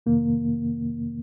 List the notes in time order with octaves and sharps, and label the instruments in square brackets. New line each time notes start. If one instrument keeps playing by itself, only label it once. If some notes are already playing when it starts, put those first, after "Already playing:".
[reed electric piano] F2 C3 D#3 A#3